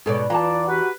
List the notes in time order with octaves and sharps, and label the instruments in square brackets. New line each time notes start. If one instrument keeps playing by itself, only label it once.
[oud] G#2 B2 D5 [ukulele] G#4 A4 C#5
[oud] E2 E3 [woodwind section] F4 D5 [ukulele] A5 A#5
[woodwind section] F#4 G4 B4